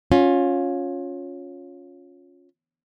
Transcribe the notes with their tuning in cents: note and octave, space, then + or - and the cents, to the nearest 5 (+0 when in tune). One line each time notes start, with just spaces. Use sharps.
C#4 +0 F4 +25